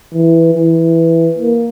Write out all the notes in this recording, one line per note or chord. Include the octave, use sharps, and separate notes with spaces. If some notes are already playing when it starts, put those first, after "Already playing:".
E3
E3
A#3